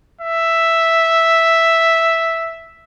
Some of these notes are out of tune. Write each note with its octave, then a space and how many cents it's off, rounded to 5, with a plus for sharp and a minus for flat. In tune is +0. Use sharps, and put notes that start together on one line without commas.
E5 +0